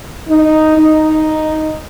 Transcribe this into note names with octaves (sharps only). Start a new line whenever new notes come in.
D#4
D#4